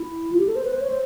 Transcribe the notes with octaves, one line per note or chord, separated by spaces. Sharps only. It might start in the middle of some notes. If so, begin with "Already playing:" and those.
Already playing: E4
F4
G4
A4
C5
B4
C5
C#5
C5